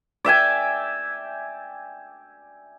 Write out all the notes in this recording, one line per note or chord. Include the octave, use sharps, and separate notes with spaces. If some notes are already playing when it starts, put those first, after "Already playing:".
D5 E5 G5 G#5